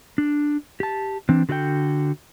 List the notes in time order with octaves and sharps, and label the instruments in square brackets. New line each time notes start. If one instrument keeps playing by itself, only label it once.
[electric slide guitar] D4
G4 A5
E3 C4 D4
D3 F#4 A4 D5 G5